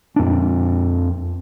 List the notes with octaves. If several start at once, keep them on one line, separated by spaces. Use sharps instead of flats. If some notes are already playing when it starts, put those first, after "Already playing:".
F2 D4